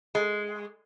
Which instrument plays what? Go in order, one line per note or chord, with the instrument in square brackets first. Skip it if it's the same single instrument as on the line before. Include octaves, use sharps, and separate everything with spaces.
[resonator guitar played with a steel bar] G#3